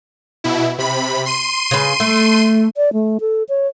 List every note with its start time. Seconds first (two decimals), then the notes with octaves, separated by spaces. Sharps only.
0.44 B2 E4
0.78 C3 B5
1.26 C6 D#7
1.71 C#3 B4
2.00 A3
2.77 D5
2.93 A3
3.21 A4
3.49 C#5